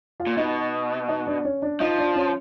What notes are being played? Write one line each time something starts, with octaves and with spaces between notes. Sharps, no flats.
F4 F5
A#2
B2 D#4 D#5
D#4 D#5
D4 D5
C#4 C#5
D4 D5
F3 D#4 D#5
D4 D5
C#4 C#5